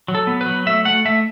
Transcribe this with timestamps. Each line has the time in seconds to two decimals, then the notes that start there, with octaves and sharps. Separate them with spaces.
0.08 F#3
0.15 A4
0.27 B3
0.41 B4
0.46 F#3
0.67 A3 E5
0.85 A3 F#5
1.05 A3 E5